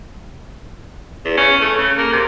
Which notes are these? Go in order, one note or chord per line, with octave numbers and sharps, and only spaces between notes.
E2
C#4
A3
C#3
A#3
C3